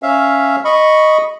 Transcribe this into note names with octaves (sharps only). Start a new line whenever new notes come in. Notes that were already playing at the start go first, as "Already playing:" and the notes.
C#4 E5 F5
D#5 B5 C#6